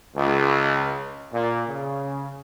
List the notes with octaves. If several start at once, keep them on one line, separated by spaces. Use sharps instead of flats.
C#2
A#2
C#3